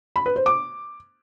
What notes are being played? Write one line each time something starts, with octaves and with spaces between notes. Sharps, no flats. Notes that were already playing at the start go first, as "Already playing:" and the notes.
B5
B4
C5
D6